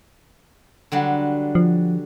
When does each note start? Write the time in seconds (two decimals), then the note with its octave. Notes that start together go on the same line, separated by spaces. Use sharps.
0.92 D3 F#3 G3
1.55 F3